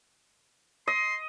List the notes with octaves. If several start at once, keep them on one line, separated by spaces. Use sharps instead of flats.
D#5 C6